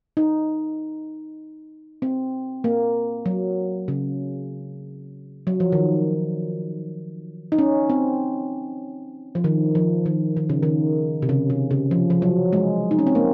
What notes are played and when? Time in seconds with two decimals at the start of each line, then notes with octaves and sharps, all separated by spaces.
0.17 D#4
2.02 C4
2.64 A#3
3.26 F#3
3.88 C#3
5.47 F#3
5.60 F3
5.72 D#3
7.52 D#4
7.59 C#4
7.90 C4
9.35 F3
9.44 D#3
9.75 F3
10.06 D#3
10.37 D#3
10.50 C#3
10.63 D#3
11.22 C3
11.29 C#3
11.50 C3
11.71 C#3
11.91 F3
12.10 F3
12.22 F#3
12.53 G#3
12.91 D#4
12.99 C#4
13.07 C4
13.15 A#3